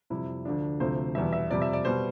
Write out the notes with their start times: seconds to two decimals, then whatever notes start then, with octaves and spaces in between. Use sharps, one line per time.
0.10 F2 C3 G3 E4
0.45 D2 D3 F3 D4
0.80 D2 C3 F3 A3 C5
1.15 E2 B2 G3 E5
1.33 E5
1.50 F2 C3 G3 D5
1.62 E5
1.73 D5
1.85 B2 G3 C5